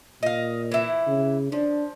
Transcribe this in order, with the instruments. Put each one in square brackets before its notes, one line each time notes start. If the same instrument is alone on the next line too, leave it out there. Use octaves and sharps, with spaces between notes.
[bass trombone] A#2 [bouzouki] D#5 F5
[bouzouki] E3 E4
[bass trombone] C#3
[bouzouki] F3 [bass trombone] D4